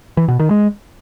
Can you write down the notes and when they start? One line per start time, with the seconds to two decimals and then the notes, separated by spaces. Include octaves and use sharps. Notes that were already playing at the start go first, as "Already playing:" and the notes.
0.17 E3
0.28 B2
0.40 D#3
0.51 G#3